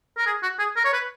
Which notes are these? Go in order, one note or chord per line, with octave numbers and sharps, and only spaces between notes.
A#4
G#4
F#4
G#4
A#4
C#5
B4